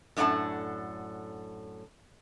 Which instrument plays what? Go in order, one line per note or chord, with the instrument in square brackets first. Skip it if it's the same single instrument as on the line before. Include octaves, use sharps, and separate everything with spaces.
[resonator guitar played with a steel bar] F#2 A2 D4 A4 F#5 A5